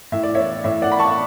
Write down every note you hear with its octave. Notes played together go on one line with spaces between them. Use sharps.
A2 E5
D5
E3 C#5 E5
A2 C#5 E5
D5 F#5
E3 B5
A5 C#6